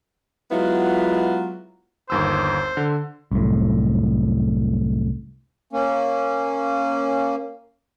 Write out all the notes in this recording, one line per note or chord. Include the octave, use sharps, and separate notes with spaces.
F#3 G#3 B3 E4 F4
G1 D#2 C5 E6
D3
C2 F#2 A2
A#3 C#4